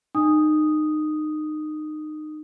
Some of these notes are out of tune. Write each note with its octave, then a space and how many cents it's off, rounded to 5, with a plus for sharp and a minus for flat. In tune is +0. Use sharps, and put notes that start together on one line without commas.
D#4 -25 D#6 +0